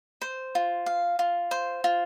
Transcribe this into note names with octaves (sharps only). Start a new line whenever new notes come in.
C5
F4
F5
F4
C5
F4